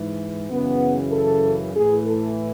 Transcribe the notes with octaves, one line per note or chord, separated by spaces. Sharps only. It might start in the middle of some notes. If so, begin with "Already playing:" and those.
Already playing: G#2 E3
F#2 C#3 E3 B3
A4
A2 E3 G#4
A4